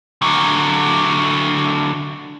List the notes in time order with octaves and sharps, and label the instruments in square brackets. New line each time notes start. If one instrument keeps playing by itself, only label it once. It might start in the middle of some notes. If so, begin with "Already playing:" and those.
[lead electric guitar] D3 F#3